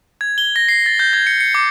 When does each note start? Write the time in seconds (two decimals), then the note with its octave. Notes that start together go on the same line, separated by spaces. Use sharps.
0.21 G#6
0.38 G7
0.56 A#6
0.68 C7
0.86 A6
0.99 G6
1.13 G#6
1.27 C#7
1.41 C#7
1.55 D6